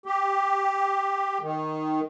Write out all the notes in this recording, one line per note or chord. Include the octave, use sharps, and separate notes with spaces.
G4
D#3